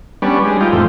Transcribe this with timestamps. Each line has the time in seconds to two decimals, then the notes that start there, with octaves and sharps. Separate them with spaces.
0.22 G3 B3 C#4 D4
0.45 G3 G#3
0.60 D#4 F4 G4
0.72 F2 A2 C4